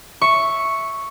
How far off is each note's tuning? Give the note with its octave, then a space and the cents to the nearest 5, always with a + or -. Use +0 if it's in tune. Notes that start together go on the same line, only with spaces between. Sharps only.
E5 +0 C#6 +0